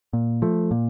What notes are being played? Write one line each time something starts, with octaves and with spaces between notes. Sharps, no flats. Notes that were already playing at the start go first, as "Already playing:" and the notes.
A#2
F3 A3
A#2